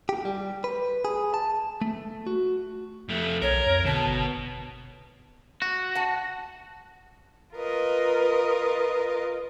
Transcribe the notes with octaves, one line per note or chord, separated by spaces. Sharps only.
G4
G3
B4
G#4
A5
A3
F#4
F2 A3
B1 A#4 C#5
F2
B2 D3 A5
G1
F#4
F#5 A5
F4 A#4 B4 D#5